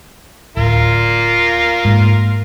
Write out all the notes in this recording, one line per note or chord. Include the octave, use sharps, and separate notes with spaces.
D1 F4 A#4
G#2 A#3